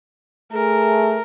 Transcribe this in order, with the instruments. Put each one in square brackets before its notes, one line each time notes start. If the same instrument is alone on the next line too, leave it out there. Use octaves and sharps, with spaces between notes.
[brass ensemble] A3 G#4 [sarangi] A#4